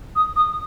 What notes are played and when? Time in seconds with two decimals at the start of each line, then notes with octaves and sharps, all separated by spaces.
0.16 D#6
0.36 D#6